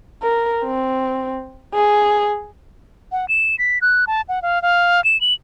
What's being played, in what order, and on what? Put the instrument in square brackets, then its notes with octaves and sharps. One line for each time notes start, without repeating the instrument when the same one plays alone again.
[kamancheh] A#4
C4
G#4
[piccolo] F#5
E7
B6
F#6
A5
F#5
F5
F5
E7
F#7